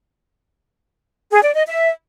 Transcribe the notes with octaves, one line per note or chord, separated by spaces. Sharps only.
G#4
D5
D#5
E5